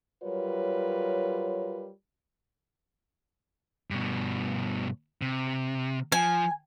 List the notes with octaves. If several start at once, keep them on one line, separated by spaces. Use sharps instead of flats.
F#3 G3 F4 A#4 B4 C#5
G2 B2
C3
F3 G#5